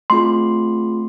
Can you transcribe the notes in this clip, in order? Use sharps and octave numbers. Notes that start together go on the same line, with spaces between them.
A3 C4 F4 G#4 C6